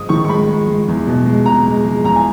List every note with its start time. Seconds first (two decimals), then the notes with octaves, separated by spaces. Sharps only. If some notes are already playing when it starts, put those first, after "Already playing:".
Already playing: G#2 G#3 D#6
0.09 D#3 C#6
0.25 C#6
0.29 G#3 B5
0.49 G#3
0.68 G#3
0.88 E2
1.07 B2
1.26 G#3
1.46 B2 A#5
1.66 G#3
1.85 G#3
2.04 E2 A#5
2.16 G#5